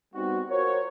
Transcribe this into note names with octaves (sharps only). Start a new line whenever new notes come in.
G3 B3 C4 D#4 F#4
F4 F#4 A#4 C5 C#5